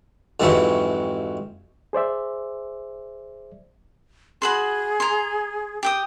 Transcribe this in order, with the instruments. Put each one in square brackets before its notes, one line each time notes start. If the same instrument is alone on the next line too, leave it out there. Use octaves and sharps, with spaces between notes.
[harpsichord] F2 G#2 C3 E3 F#3 G#3
[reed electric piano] G#4 C5 D5 E5
[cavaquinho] F#4 B5 C6 [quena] G#4
[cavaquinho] A#5 C6
G4 G5 D#6